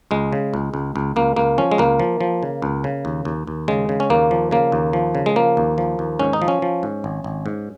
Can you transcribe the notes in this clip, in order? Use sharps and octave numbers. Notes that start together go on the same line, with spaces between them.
C#2 G#3
C#3
C#2
C#2
C#2
C#2 A#3
C#2 A#3
F3 C#4
G#3
C#2 A#3
F3
F3
C#3
C#2
C#3
D#2
D#2
D#2
C#3 G#3
C#3
C#4
D#2 A#3
F3
C#3 A#3
D#2
F3
C#3
G#3
F3 A#3
D#2
F3
D#2
G#2 C#4
D#4
F3
C#4
F3
G#2
G#1
G#1
G#2